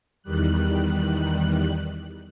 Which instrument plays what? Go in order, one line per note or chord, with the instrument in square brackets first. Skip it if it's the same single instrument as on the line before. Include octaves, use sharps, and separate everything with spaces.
[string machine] E2 D#3 G3 F#6